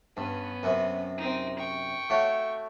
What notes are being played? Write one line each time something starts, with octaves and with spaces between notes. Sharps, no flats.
G2 B3 C#4
F#2 C3
C4 D#4
G5 C#6
A3 F#4 C#5